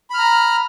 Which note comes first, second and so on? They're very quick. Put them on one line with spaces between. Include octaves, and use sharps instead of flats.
B5 F6 A#5